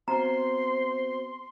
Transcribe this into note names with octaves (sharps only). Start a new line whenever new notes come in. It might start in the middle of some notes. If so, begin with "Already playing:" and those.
B3 C4 F#4 C5 A#5 C6